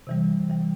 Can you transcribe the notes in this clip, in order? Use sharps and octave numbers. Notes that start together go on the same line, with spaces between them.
C3 E3 G3
C3 E3 G3